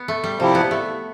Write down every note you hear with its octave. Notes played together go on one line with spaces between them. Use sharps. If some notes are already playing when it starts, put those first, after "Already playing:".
Already playing: B3
A3
G3
C3 F3 G3 C4 E4 G4
B3
A3